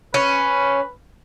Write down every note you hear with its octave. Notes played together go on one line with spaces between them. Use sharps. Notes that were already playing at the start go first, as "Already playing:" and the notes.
C#4 B4